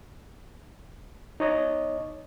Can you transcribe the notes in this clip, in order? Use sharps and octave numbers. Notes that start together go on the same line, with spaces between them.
D#4 C#5 D#5